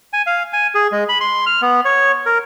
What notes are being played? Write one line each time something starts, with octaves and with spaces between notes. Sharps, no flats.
G#5
F5
G#5
G#4
G#3
B5
C6
F6
B3
C#5
A#4